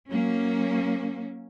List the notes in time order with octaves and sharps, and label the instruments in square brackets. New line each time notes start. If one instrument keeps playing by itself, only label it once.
[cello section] F#3 A#3 C#4